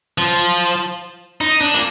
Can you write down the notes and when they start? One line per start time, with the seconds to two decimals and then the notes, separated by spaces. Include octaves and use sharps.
0.18 F3
1.41 D#4
1.61 D4
1.74 A#3